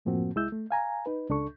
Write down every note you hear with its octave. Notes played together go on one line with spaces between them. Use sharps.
F#2 A2 F3 A#3 C4 F#4
C2 G#3 E4 E6 G6
A3
F5 G#5 A#5
D#4 B4
C#2 D4 A4 C#6